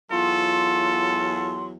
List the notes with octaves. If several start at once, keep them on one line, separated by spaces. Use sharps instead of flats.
E2 F#3 F4 A4 C6